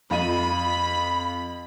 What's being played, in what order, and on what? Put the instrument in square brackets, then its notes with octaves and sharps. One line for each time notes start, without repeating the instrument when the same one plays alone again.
[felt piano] F2 F4 D#7 [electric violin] B5